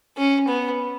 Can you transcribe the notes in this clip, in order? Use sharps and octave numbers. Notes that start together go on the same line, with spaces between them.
C#4
B3